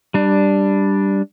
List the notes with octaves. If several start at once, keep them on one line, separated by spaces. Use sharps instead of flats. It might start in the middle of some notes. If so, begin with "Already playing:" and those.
G3 D4